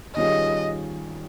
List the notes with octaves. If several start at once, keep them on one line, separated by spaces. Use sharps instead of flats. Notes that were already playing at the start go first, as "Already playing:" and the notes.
D#3 G3 C#4 F4 G#4 D#5